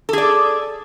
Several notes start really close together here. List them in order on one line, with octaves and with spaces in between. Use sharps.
A4 G#4 D5